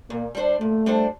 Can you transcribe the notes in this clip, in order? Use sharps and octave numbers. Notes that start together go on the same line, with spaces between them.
A#2 A#3
G3 D4 A4 C5
A#2 A3
G3 D4 A4 C5